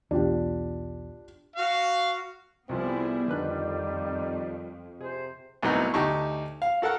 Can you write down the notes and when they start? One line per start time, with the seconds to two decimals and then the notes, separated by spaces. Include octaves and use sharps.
0.11 B1 E2 D4 F4 G4
1.56 F#4 F5
2.69 C2 F3 G3 B3 C4 E4 G#4
3.28 F2 D3 D#3 B4 F#6
5.01 C3 G#4 C5
5.63 C2 A2 F#3 B3 D#4
5.94 D2 D#4 G4 A5 C#6
6.62 F5
6.82 F#4 A4 A#4 F#5